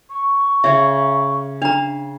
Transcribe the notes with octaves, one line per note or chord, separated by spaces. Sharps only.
C#6
C#3 C#5 E5
D4 F5 A#5